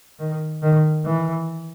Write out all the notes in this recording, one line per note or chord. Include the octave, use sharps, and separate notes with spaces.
D#3
D#3
E3